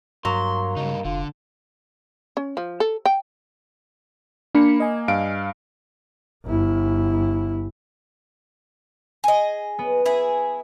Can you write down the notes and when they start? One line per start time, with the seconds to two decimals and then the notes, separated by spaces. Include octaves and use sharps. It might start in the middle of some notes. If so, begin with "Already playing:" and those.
0.25 G2 F#3 A#3 C6
0.77 G2 C#3 D#4
1.05 F1 D3 F4
2.37 C#4
2.57 F3
2.80 A4
3.05 G5
4.55 A#3 D4 B5 C#7
4.80 D#5 G#5
5.08 G2 F5 D7
6.45 G1 E4
9.24 G#4 D#5
9.79 B3
10.06 E4 G#4